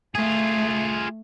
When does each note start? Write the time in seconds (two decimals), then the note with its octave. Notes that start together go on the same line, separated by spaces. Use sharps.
0.15 A3 F4 G#4